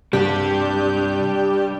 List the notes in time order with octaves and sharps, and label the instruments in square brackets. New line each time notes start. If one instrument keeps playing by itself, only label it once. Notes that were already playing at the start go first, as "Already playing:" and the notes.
[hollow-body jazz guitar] C2 G2 [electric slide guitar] G3 D4 [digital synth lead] G4